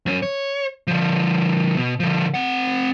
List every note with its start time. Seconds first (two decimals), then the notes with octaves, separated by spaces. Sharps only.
0.06 F#2 C#4
0.23 C#5
0.87 D3 F3
1.77 B2
2.00 D3 F3
2.34 C4 F#5